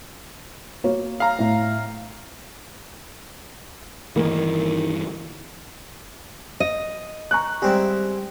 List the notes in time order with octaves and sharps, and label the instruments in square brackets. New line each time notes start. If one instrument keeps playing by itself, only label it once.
[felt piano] A#3 F#4 C#5
[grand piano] F5 A#5
[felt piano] A2
[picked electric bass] G1 E3 [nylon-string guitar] D#3 A#3
[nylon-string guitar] D#5
[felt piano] A#5 C#6 F#6
[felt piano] G3 [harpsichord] G#3 C4 E4